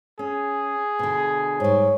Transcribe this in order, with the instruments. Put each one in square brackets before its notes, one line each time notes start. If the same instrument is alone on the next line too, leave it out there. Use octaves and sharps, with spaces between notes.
[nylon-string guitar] C#4 [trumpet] G#4
[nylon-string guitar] B2 D3
[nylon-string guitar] G#2 G3 [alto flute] C#5